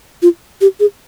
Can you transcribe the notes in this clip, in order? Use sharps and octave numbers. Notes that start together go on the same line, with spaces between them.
F4
G4
G#4